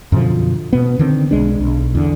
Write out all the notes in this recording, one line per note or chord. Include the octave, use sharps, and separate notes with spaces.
F#2 B2 D3 F3
B2 B3
D3 D#3 C4
B1 G#3 D4
B1
E2 D3